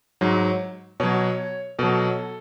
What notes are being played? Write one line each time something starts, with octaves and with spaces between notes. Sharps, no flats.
G#2 F#3
B2 F#3 C#5
B2 F#3 A4